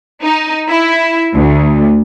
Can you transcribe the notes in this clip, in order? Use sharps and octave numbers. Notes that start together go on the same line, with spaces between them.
D#4
E4
D2